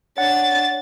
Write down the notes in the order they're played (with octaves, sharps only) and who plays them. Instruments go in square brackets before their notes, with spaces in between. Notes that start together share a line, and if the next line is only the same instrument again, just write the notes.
[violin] D4 A6 [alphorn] C#5 [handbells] F#5